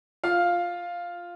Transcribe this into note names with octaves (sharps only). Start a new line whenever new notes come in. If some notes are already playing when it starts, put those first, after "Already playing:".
F4 F5